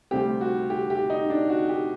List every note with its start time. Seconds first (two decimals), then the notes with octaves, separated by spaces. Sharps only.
0.11 D2 C3 G3 C4 G4
0.41 F#4
0.70 G4
0.90 G4
1.10 D#4
1.30 D4
1.49 F#4
1.69 G4